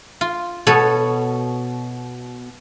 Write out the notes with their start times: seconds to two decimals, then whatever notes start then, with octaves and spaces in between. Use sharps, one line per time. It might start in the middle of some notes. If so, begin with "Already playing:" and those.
0.21 F4
0.67 B2 B3 F#4 A4 C#5